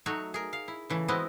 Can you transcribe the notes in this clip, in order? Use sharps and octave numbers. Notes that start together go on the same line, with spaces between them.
F#3 A3 D#4 F#4 C#5
G#4 A#4
F5
E4
C#3 E3 A3
G#3 B3 C4 E4 F#4 D#5